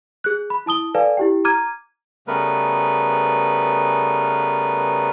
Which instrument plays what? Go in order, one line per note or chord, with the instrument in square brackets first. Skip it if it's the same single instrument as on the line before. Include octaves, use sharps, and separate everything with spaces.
[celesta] G#4 F#6
B5
E4 A5 D#6 G7
A4 B4 D5 F5 G#5 A5
E4 G4 G5
A#5 D6 F6 G#6 D#7
[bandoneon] C#3 G3 A3 B3 A#4 B4